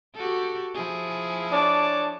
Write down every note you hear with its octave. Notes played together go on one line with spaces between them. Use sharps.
F#4 G4 A4
F3 E4 G#4
D4 C#5 A5 D6